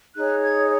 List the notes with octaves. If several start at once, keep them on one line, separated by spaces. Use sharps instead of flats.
D#4 G#4 C#5 F#6
G#6